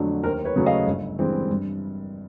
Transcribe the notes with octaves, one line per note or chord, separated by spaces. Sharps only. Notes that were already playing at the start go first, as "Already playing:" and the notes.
Already playing: F2 D3 F#3 A3 D4
D#2 A#4 C5
B4 C#5
C#3 F#3 A3
D#5 F5
G1
G2 E3 G#3 C4
G2